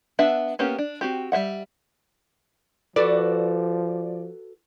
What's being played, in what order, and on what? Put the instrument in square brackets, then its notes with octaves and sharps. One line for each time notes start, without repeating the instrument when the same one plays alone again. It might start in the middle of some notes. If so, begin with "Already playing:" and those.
[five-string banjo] B3 D4 E5 F#5
A#3 B3 C#4 G4
D4
C4 F#4 G4
G3 C5 E5 F#5
[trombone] F3 [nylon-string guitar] F#4 A4 B4 [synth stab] D5